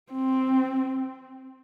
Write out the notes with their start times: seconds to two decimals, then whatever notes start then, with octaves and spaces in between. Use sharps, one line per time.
0.12 C4